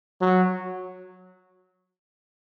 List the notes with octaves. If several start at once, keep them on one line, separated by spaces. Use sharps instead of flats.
F#3